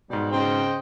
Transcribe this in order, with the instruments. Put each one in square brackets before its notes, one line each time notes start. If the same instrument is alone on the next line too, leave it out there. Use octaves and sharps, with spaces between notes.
[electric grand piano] G#2 B2 [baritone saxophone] G3
[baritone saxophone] C#3 [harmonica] C5 D#5 G5